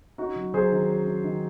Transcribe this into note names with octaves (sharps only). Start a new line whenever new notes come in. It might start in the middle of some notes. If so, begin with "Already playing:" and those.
C#4 D#4 F#4
F#3
F#3 G#4 C5
D#3
C#4
C#4
D#3